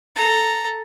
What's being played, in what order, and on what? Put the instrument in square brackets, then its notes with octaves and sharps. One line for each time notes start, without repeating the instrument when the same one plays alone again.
[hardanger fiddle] A4 A#5